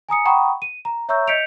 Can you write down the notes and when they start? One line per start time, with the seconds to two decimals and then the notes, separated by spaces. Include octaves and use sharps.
0.09 G#5 A#5 D#6 C#7
0.25 F#5 G5 A#5 B5 C#6 D#6
0.62 D#7
0.85 A#5
1.09 C#5 E5 A#5 C#6 E6 G6
1.28 D#5 G6 B6 C#7 D7 F7